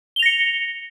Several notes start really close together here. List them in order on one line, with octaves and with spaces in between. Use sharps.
G7 F7 A#6 C#7